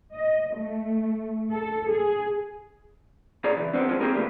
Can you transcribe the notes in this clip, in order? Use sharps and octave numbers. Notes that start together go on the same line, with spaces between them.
D#5
A3
A4
G#4
A#2 G#4 C#5 D5 A#5
C#2 E3
D#3 G#3 B3 C4 D4
D#3 F3 G#3 C4 C#4
A#3 C4 D#4 G4 G#4 A#4
C#3 F3 G#3 A3 B3 D4